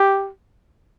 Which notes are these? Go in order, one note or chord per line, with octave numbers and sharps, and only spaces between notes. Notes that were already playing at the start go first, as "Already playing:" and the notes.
Already playing: G4